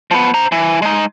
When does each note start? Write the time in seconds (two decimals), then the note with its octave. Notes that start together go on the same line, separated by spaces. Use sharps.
0.11 F3 B3
0.34 C5 A#5
0.52 E3
0.82 G#3 D#4